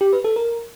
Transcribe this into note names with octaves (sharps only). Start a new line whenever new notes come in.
G4
B4
A4
A#4